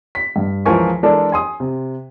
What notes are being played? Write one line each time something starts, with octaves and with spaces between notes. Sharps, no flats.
B6
G2
C#2 E3 F3 A#4 G#5 C#6
E3 G#3 D4 A4 A#4
G#5 C6 D#6
C3